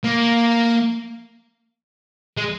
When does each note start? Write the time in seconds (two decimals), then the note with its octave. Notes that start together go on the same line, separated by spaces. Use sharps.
0.04 A#3
2.37 G#3